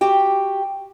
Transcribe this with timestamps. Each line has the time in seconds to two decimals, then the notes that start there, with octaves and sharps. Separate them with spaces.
0.01 F#4 G4 G5